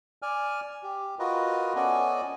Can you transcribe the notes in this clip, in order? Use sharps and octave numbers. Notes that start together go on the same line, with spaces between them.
D5 G#5 F6
G4
F4 F#4 A#4 B4 D#5
B3 C#4 A4 D5 D#5 G#5